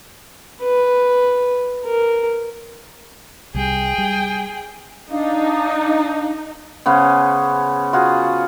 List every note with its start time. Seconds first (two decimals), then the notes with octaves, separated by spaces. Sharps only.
0.62 B4
1.86 A#4
3.54 C2 G3 G#4 G5
3.98 G3
5.11 D4 D#4 F5
6.86 C#3 B3 C#4 C5
7.93 F4 F#4 G#4